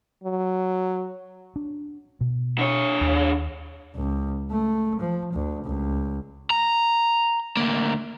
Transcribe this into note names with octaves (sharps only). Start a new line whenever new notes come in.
F#3
D4
B2
D3 C#5
D#2
C#2
A3
F3
D2
C#2
A#5
D2 A#3